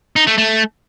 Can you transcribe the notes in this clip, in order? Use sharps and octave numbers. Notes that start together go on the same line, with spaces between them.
D#4
A3
A3